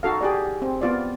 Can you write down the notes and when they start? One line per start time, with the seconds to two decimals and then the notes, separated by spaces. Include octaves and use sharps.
0.03 D#4 F#4 A4 F5
0.21 G4 G#4 D5
0.62 C4
0.81 B3 F4 D5